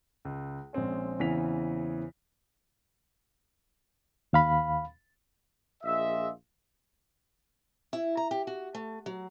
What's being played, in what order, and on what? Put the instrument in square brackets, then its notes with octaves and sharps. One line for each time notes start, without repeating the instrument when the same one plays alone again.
[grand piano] C#2
A#1 G#3 C4 C#4
E2 C#3 E3 C4 B6 F7
[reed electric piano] D#2 F5 B5
[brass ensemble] A#1 F4 G#4 D#5 E5
[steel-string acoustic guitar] E4
A#5
G4
F#4
A3
F#3